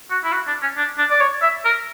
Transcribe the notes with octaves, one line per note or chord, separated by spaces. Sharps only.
F#4
E4
F#4
D4
C#4
D4
D4
D5
C#5
E5
A#4